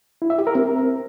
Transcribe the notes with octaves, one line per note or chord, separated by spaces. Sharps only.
E4
E5
G4
A#4
C4